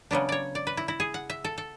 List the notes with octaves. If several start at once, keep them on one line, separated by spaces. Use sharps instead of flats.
C#3 F#3 B3 D4
C#5 D5
D5
B4
E4
E4
G#4
F#5
E5
A4
A4